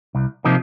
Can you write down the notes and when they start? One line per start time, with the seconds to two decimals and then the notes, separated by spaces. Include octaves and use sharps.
0.15 C2
0.45 C3 F3 A#3 D#4